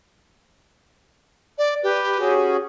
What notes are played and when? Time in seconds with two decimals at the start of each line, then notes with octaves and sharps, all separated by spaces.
1.58 D5
1.83 G4 B4
2.18 C#4 F#4 G#4